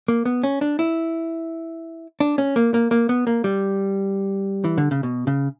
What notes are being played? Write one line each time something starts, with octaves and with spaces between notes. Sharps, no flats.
A#3
B3
C#4
D4
E4
D4
C#4
A#3
A#3
A#3
B3
A#3
G3
E3
D3
C#3
B2
C#3